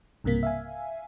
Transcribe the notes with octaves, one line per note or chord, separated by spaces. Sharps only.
B1 G2 C3 A#3 B6
E5 F5 G#5